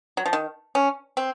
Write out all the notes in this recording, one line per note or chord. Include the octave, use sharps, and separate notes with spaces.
F#3
F3
D#3
C#4
C4